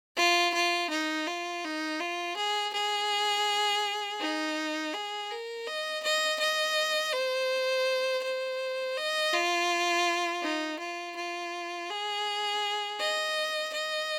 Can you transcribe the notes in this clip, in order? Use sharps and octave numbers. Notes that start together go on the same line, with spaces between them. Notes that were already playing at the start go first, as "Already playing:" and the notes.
F4
F4
D#4
F4
D#4
F4
G#4
G#4
D#4
G#4
A#4
D#5
D#5
D#5
C5
C5
D#5
F4
D#4
F4
F4
G#4
D#5
D#5